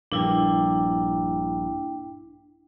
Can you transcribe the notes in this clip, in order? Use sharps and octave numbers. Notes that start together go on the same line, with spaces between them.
A#1 G2 A#3 D4 E4 G5